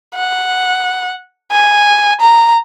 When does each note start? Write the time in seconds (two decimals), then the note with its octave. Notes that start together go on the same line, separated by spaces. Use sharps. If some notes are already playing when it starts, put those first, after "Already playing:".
0.15 F#5
1.52 G#5
2.21 A#5